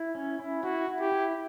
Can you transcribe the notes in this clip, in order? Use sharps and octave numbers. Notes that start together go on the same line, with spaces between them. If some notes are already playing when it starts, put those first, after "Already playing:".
Already playing: E4
C#4
E4
E4 F#4
E4
G4
E4